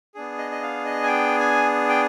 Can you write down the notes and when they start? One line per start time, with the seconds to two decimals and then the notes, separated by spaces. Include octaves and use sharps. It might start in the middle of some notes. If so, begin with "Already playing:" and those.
0.15 B3 D4 G#4
0.38 D#5
0.51 D#5
0.63 F5
0.85 D#5
1.03 G#5
1.08 G5
1.39 G#5
1.89 G5